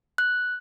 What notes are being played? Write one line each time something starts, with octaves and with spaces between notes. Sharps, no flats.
F#6